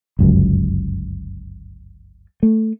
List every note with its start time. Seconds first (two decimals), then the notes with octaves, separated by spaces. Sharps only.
0.19 G1 C#2 F#2
2.43 A3